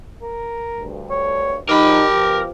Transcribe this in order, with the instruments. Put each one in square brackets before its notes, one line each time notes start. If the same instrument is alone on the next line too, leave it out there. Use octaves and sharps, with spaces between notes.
[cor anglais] A#4
[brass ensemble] D2 G2
[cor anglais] C#5
[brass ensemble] F3 D#4 [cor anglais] G4 [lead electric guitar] A#4 B5
[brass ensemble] B2 F3